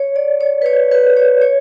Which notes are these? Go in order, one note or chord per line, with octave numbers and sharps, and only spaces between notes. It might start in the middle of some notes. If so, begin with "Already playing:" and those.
Already playing: C#5
D5
C#5
B4
C#5
B4
C#5
C#5